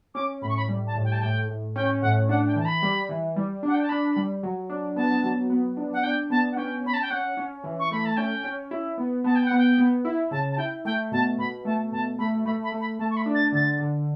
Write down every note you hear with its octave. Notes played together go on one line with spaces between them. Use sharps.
C#4 D6
A2 B5
C#6
B5
G3
A5
A2
G5
A5
A2 G5
A2
C#4 G5
A2 F#5
D4 F#5
G5
E3 A5
B5
G3
E3
G3
D4 F#5
G5
A5
D4 B5
G3
F#3
D4
B3 A5
F#3
B3
D4
F#5
D4 G5
B3 A5
F#5
C#4 G5
C#4 B5
A5
G5
C#4 F#5
C#4
E3
C#6
A3 B5
A5
C#4 G5
C#4
E4
B3
B3 A5
G5
B3 F#5
G5
B3
E4
C#3 A5
A5
E4 G5
A3 G5
B2 A5
B2 B5
A3 A5
B2 A5
A3 B5
A3 B5
B5
A3
B5
A3 A5
C#6
B5
D4
A6
D3 A6
D3